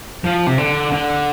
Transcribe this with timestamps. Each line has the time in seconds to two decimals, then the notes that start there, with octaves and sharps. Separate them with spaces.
0.24 F3
0.47 C3
0.58 D3
0.92 D3